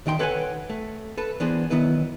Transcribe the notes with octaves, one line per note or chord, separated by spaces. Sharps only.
D2 D#3 D#4 G5 C6
A4 B4 C#5 D5 F#5 G#5
A3
A4 B4
E3 B3 D4 G#4 C5
B1 B2 D#3 B3 E4 B4